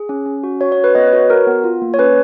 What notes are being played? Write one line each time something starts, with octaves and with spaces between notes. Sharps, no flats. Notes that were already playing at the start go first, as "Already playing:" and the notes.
Already playing: G#4
C#4
C#4
F#4
F#4 C#5
C#5
C#4
B4
B3 D#5
B4
F#4 C#5
F#4 A#4
B3
F4
A#3
C#5
C#4 B4